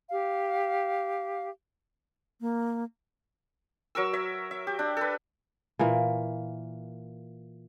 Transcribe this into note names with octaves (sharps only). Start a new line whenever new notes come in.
G4 F5
A#3
F#3 A#4 C#6 E6
C#5 E5
E5
G4
D4
A4 B4
A#2 E3 A#3